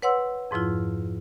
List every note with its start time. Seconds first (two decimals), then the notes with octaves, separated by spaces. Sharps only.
0.02 B4 C#5 F#5 C6 E6
0.51 F2 G#2 F3 E4 F4